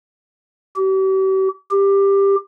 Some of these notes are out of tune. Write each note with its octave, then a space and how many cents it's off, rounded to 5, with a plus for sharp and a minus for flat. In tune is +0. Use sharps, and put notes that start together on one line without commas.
G4 -40
G4 +15